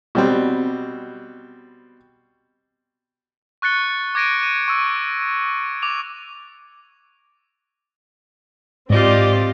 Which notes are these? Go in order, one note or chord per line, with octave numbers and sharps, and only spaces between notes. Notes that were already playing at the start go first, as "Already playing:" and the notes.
B2 G3 C4
C#6 F#6 A6 C#7 G7
D6 G#6 A#6 D7 D#7
D#7
C#6 E6 D#7
D6 F7
G#2 C4 F4 G4 D5 D#5